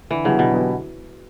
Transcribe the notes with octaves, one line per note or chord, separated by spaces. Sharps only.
D3 E3
C#3 F#3 B3 E4 G4
B2 D3
F#3 B3 E4 G4